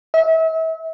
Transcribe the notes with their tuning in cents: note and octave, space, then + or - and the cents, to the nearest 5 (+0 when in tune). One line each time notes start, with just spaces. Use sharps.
E5 -35